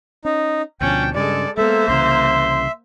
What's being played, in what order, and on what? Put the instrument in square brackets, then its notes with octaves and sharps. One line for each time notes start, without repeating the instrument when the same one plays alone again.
[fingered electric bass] C#4 [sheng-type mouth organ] D#4
[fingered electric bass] D2 B2 F3 [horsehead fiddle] C#4 D4 [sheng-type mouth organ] G5
[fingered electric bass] G2 C#3 [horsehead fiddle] G#3 A4 [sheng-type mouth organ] D5
[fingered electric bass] G#3 B3 [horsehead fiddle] A#3 C5 [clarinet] A4 [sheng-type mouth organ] E5
[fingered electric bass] C2 C#3 E3 [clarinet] C6